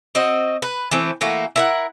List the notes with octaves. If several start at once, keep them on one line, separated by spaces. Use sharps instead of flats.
C4 F#4 D#5
B4
E3 A3 C4
E3 A3 A#3 F#4
E4 A#4 F#5